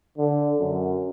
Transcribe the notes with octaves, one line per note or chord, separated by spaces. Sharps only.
D3
F#2